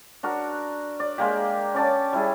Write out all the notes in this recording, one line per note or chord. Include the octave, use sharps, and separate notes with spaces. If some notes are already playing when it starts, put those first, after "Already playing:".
D4 F#4 A#4
D5
G#3 A#3 G4
C#4 D5 A5
G3 E4 G#4